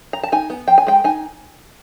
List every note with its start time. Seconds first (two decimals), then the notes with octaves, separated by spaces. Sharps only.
0.13 A#5
0.23 A5
0.32 D#4 G#5
0.50 B3
0.67 F3 G5
0.78 G#5
0.87 G#3 G5
1.04 D#4 G#5